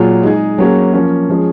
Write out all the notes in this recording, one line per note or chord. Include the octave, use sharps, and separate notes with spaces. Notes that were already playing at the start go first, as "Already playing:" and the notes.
Already playing: A#2 F#3 F4 G#4
G#3 D#4 G#4
F#3 A#3 C#4 G#4
F3 A#3 C#4
F3 G#3 C#4 G#4